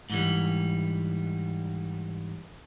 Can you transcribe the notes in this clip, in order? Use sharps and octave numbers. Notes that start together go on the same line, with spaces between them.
G#2 E3 G3